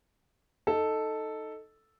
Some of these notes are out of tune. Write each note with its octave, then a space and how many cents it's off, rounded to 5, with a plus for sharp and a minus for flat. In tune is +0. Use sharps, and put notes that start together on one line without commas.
D#4 +0 A4 +0